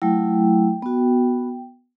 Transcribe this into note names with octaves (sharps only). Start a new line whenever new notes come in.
F#3 A3 E4 G5
B3 F#4